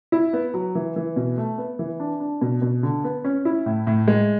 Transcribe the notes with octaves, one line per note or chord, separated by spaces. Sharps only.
E4
B3
F#3
E3
E3
B2
A3
B3
E3
D4
D4
B2
B2
D3
B3
C#4
E4
A2
A2
G#3